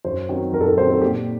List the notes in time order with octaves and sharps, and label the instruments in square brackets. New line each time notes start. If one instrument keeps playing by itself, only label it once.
[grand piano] F#2 [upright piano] C5
[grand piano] D#3 F#3 C4
[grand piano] F#2 [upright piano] A#4
[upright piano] A4
A#4
[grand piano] D#3 F#3 C4 [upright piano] C5
[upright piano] A4
[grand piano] A#2 [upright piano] G4